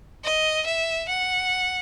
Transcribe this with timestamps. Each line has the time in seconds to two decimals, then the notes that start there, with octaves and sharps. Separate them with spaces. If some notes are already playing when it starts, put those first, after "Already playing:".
0.24 D#5
0.67 E5
1.09 F#5